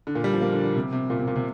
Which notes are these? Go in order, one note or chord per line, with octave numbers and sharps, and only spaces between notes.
D3
A#2
G3
F3
A#3
D3
D3
C3
C3
A#2
C3
A#2
C3